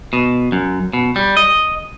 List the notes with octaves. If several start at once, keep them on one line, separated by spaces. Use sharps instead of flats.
B2
F#2
B2
G3
D#5